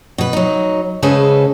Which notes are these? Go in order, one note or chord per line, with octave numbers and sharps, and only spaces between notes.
B2 B4
F#3 D#4
C#3 G#3 G#4 A4 B4 C5